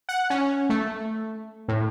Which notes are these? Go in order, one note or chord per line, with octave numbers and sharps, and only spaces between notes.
F#5
C#4
A3
A2